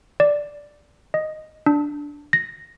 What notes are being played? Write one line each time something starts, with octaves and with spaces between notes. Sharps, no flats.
D5
D#5
D4
A#6